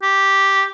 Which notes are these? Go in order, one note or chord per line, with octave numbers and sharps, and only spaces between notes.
G4